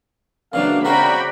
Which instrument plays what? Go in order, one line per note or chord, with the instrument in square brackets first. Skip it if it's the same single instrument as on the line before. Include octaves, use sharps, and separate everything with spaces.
[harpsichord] C#3 E3 F#3 [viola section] A#3 D4 [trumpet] F5
[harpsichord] C#3 C4 E4 [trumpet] F#4 [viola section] D5 G5 B5 [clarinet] A#5